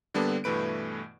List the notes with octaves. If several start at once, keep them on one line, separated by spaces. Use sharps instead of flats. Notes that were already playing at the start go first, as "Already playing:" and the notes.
D3 G3 A#3 B3 D4 A4
G2 B2 E3 A3 B4 D7